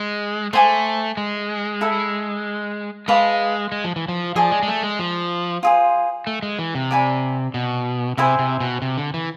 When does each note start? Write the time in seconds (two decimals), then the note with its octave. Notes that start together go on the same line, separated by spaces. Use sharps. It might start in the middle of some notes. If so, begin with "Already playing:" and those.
Already playing: G#3
0.53 A3 C5 G#5 D6
1.17 G#3
1.81 E4 A4 E5 B5
3.08 G#3 B4 F5 A5 D6
3.72 G#3
3.84 F3
3.96 E3
4.09 F3
4.36 F3 G#4 D5 A5
4.51 G#3
4.63 G#3
4.68 A3
4.83 G#3
4.99 F3
5.63 F4 G#4 C5
6.27 A3
6.43 G#3
6.59 E3
6.75 C3
6.91 D5 G#5 B5 D6
7.54 B2
8.18 C3 E4 G#4 C5 G#5
8.39 C3
8.60 B2
8.82 C3
8.98 D3
9.14 E3